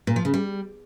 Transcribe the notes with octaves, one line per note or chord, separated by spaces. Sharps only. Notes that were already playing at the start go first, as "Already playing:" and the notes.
A#2
F3
C#3
G3